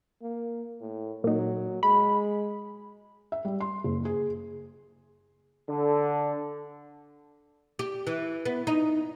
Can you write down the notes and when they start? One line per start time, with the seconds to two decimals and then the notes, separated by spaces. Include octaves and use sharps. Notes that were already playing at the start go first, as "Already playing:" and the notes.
0.22 A#3
0.81 A2
1.24 A#2 F#3 D#4
1.83 G#3 B5
3.32 E5
3.45 G3
3.60 C6
3.84 F#1
4.05 G#4
5.68 D3
7.79 G4
8.07 E3
8.45 B3
8.67 D#4